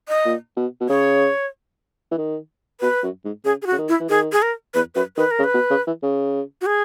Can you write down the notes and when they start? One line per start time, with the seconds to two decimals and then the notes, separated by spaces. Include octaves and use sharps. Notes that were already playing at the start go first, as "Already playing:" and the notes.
0.08 D#5
0.25 A#2
0.57 B2
0.80 B2
0.89 C#3 C#5
2.11 E3
2.18 D#3
2.81 B2 B4
3.03 F#2
3.25 G#2
3.45 C#3 G#4
3.62 G#4
3.66 F#4
3.72 C#3
3.78 D#3
3.89 E4
4.00 E3
4.09 D#3 G#4
4.32 G#4
4.42 A#4
4.74 E2 B4
4.95 F#2 B4
5.17 D#3 B4
5.31 A#4
5.39 C#3
5.44 B4
5.54 B2
5.70 C#3
5.87 E3
6.03 C#3
6.61 F#4
6.66 G#4